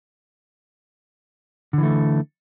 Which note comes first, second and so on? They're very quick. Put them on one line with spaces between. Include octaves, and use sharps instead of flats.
D3 E3 A3